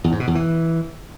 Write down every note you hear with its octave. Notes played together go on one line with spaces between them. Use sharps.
E2
G#2
B2
E2
E3